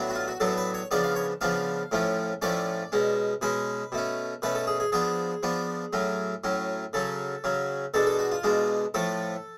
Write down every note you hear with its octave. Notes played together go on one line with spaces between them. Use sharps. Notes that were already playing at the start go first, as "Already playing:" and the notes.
Already playing: A2 F#3 B3 D4
F#4
F4
F#4
A2 F#3 B3 D4 A4
B4
C#5
C#3 F3 B3 D4 D5
F5
C#5
C#3 F3 B3 D4 F5
A2 F3 A3 C#4
A2 F3 A3 C#4 D5
B2 G#3 C#4
B2 G#3 C#4 B4
B2 A3 C#4
B2 A3 C#4 B4
A4
G#4
G#4
F3 B3 D4 G#4
F3 B3 D4
A2 F#3 C#4
A2 F#3 C#4
C#3 F#3 C#4 A4
C#3 F#3 C#4
B2 G#3 D4 A4
A4
F#4
F4
B2 G#3 D4
A2 F3 A3 A4